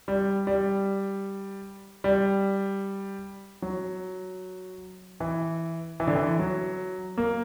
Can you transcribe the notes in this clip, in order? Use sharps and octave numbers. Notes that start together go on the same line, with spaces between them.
G3
G3
G3
F#3
E3
E3
D3
E3
F#3
A#3